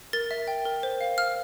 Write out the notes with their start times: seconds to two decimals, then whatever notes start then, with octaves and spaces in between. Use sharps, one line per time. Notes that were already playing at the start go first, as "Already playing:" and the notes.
0.13 A#4 A6
0.31 E5
0.48 G5
0.65 A#4
0.83 C5
1.01 F5
1.18 F5 F6